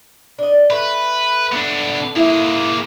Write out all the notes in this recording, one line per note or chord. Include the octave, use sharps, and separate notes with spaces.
D4 D#5
A3 B4
B3 D4
A#3 E4 G#4 E5